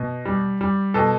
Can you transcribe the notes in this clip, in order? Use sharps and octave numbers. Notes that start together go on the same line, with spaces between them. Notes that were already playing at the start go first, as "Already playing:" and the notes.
Already playing: B2
G3
G3
B2 A4